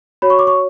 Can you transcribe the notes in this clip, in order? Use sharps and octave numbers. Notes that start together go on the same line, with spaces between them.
F#4 C#5 B5
C#6
D6
C#6